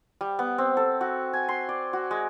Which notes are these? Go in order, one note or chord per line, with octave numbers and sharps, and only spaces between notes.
G3
B3
C4
A4
F#4
G#5
C6
D5
F#4
G#3